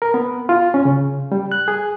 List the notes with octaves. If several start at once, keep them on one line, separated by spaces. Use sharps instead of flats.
A#4
B3
F4
C#4
C#3
G3
F#6
G#4